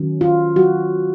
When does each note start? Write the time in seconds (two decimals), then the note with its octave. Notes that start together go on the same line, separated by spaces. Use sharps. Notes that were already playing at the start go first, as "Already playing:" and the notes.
Already playing: D#3 F#3 C#4
0.21 F4
0.56 F#3 F#4